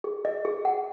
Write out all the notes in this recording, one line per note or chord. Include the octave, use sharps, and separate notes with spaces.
G#4
D#5
G#4
F#5